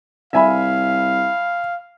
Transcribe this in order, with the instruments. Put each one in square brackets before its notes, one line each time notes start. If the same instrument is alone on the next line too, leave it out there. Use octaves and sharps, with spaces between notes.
[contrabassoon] C2 [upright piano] E5 G#5 B5 [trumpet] F5